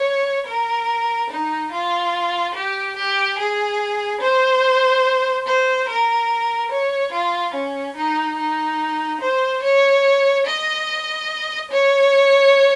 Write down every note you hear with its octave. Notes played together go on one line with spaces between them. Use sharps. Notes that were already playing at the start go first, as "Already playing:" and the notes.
Already playing: C#5
A#4
D#4
F4
G4
G4
G#4
C5
C5
A#4
C#5
F4
C#4
D#4
D#4
C5
C#5
D#5
C#5